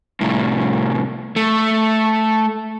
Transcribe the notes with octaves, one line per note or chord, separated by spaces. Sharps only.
C2 A2
A3